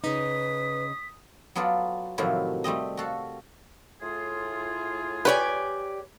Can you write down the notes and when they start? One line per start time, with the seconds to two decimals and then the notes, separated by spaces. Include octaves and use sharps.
0.04 C#3 D#4 B4 D#6 B6
1.55 F#3 B3 F4 A4 D5
2.18 A2 C3 D#3 F3 F#3 E4
2.64 G3 A3 C4 D#5
2.97 F#4 A4 F5
4.02 A2 F4 G#4
5.25 G4 B4 C#5 D5 G#5